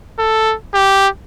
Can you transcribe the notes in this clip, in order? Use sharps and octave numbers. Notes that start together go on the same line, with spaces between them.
A4
G4